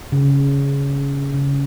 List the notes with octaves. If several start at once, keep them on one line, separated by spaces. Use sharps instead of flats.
C#3
C#3